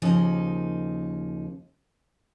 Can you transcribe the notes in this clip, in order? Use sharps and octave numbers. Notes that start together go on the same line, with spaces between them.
D#2 C#3 F3 A#3 D#4